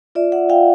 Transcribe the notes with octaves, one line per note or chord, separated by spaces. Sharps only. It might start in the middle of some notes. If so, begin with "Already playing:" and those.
F4 D5 E5
E5 F#5
F4 F5 G5